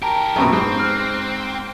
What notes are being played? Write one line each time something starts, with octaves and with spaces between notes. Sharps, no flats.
G4 A#4 G5 A5 A#5
A#1 F#2 B2 B5 C#6 E6
G#2 C4 D#6
F6 F#6